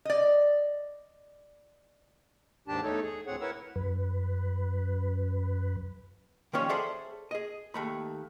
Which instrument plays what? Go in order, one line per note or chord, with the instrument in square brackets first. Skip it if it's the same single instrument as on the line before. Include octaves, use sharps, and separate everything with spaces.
[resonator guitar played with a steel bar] D5 D#5
[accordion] D#2 G#2 D#3 D4 G4 A5
E2 A3 D#4 A4 C#5
G#4
D2 A2 C4 G#4 C#5 F#5
E4 A#4 B4 C#5 F#5 E6
[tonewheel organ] F#2 B4
[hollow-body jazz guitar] D#3 F3 G3 C#4 C#5
G#4 A4 C5 D5 E5 F#5
G#4 D#5
D#2 A3 B5